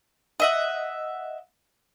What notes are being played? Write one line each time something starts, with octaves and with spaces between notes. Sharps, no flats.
D#5 E5 F#5